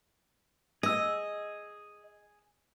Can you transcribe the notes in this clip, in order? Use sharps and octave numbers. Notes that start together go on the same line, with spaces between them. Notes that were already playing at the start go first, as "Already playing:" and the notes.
G#4 D#5 E6